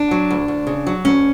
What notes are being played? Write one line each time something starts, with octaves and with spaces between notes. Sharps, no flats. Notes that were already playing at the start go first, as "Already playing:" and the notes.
Already playing: D4
F#3
D2
D2
C#3
F#3
D2 C#4